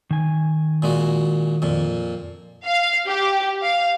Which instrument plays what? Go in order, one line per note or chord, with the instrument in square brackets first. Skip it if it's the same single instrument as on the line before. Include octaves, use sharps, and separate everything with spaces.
[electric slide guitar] D#3 G#5
[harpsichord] A#2 G#3 F#4
F2 A#2
[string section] F5
G4
F5